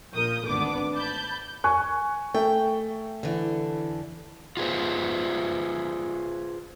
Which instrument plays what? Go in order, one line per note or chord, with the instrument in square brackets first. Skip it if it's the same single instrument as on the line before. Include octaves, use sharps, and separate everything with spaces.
[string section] A#1 A#2 A#4 D#6 G6
G#1 D2 B3 D4 D6
A5 B5 G6
[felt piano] G#5 C#6 F#6
[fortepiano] A3 [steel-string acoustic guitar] G5
[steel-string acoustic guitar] D3 E3
[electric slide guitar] F4 G#4 B4 C5